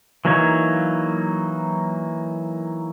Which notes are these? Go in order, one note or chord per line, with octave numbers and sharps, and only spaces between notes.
E3 F#3 A#3 D#4 C#5